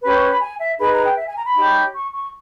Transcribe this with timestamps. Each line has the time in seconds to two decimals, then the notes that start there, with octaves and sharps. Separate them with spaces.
0.02 C#4 G4 B4 B5
0.15 C#6
0.28 B5
0.41 G#5
0.59 E5
0.79 D#4 G#4 B4 B5
0.92 A#5
1.04 G5
1.17 E5
1.26 G#5
1.36 A#5
1.45 B5
1.55 D#4 G4 C#5
1.93 C#6
2.12 C#6